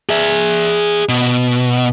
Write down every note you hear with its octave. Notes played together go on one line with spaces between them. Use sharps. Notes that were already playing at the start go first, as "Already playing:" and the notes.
G#4 E5
B2